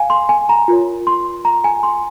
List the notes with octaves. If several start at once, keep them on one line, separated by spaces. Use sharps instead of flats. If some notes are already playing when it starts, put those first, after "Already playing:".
Already playing: F5 G#5
C6
G#5
A#5
F4 A#4 C#5
C6
A#5
G#5
C6